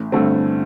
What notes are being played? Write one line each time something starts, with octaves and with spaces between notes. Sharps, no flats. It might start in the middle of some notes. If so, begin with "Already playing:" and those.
Already playing: A1
G2 D3 A3 C4